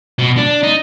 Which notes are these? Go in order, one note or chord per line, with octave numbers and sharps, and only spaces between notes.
B2
D4
D#4